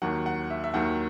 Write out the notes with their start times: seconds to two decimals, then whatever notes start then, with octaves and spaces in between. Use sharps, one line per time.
0.02 D#2 D#3 F#3 F#5
0.26 F#5
0.50 E5
0.64 E5
0.74 D#2 D#3 F#3 F#5